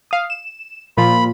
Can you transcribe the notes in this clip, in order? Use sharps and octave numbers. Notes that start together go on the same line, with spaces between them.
F5 D#6
E7
A#2 F3 F4 B5